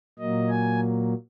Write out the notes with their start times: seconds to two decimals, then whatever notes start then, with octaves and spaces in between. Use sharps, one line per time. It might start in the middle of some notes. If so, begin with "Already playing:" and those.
0.19 A#2 F#3 A#3 D#5
0.49 G#5